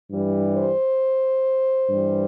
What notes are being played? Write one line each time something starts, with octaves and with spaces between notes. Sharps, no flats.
G2 E3 G3
C5
G2 E3 G3